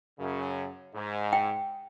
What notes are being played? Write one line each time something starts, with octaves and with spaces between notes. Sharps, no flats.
F#2 C#3
G#2
G5